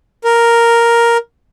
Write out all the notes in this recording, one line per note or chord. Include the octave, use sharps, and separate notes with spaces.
A#4